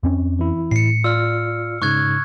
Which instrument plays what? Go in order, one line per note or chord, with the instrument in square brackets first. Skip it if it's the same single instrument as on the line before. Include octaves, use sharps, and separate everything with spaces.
[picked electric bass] F2 C4 C#4
[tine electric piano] E3 E4
[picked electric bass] A2 [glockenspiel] C7 C#7
[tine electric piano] F4 D5 [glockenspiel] E6 F6
[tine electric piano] G#2 C#3 [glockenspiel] C#6 F#6 G#6